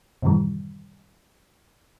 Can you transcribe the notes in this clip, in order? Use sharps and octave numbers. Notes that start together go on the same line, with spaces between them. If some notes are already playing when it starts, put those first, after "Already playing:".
F#2 A2 C3 D#3 E3 G3